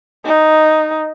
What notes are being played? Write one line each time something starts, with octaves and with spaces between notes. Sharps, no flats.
D#4